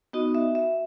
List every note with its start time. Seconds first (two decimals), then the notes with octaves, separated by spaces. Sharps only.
0.13 B3 D#4 F#4 D#5
0.35 E5
0.55 E5